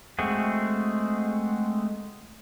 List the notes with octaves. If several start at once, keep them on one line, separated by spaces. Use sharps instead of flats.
G#3 A3 C4 F#4 G#4